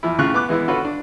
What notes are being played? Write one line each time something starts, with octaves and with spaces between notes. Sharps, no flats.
E2 F3 E4
A2 C#3 F4 C#6 F#6
B3 D6 F#6
E3 G#3 B3 E4
D3 F4 F#4 A4 B4 C#5
D4